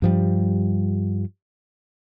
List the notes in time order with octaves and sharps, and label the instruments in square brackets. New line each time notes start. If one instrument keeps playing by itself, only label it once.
[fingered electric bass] G2 F3 G3